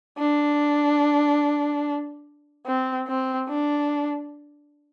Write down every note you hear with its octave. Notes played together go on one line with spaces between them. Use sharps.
D4
C4
C4
D4